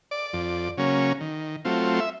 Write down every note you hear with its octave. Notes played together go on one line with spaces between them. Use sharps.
D5
F2
C#3 F#3 A#3 C#4
D#3
F#3 A3 C4 F4
E5